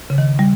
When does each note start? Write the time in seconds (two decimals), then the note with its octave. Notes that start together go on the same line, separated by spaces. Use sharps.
0.10 C#3
0.18 D#3
0.39 G3